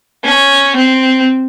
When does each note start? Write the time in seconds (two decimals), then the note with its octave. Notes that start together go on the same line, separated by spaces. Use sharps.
0.24 C#4
0.76 C4